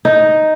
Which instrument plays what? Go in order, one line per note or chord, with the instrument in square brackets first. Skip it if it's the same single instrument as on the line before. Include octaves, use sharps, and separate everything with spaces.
[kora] D#4